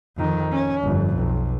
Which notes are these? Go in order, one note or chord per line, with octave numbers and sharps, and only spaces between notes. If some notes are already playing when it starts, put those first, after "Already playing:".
F2 D#3
C#4
G1 F2
B1